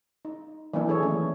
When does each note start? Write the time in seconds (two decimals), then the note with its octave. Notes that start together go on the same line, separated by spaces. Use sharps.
0.25 D#4
0.74 E3 F#3 A#3 B3 D4 E4
0.87 A#3 D4 G#4 A4 C#5
1.02 D#3 E3 A3 C#4